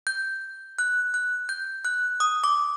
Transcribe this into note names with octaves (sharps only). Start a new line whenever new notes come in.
G6
F#6
F#6
G6
F#6
D#6
D6